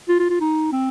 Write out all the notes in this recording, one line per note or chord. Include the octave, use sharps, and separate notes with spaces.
F4
F4
F4
D#4
C4